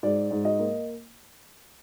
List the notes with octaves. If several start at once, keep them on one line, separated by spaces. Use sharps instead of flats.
G#2 D5
G#2
D#5
A#3